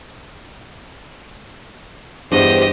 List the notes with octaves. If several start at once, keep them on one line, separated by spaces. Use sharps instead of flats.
E2 G2 B3 G4 C5 D#5